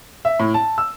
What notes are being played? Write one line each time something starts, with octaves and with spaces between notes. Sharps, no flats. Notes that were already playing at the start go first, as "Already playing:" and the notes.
E5
A2
A5
E6